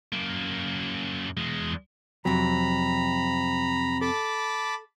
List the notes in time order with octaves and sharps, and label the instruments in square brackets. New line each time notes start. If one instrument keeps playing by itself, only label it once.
[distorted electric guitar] F#2 A#3
E2 G#3
[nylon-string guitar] F2 C3 [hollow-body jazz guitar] F#3 [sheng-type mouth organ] A#5 B5
[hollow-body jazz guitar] A4 [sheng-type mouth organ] A5 B5 D6